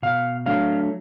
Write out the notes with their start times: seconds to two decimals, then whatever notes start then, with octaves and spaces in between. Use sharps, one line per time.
0.03 B2 F5
0.46 F#3 A3 D4 F5